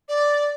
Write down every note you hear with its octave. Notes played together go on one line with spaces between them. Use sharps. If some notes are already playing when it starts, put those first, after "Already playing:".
D5